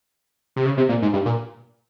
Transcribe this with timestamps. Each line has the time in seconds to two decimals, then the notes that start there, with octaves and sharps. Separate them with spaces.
0.56 C3
0.65 C#3
0.77 C3
0.89 A#2
1.02 G#2
1.13 G2
1.26 A#2